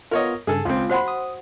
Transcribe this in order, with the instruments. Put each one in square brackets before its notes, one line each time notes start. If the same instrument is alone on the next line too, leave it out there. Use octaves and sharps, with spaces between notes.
[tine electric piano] B3 F4 [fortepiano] A#4 C#5 D#5
[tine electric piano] G2 C#3 [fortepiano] G#4 A4
[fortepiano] C#2 C4 [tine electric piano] F4
[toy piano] F#4 C5 F#5 [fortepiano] B5 C6
[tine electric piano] D#6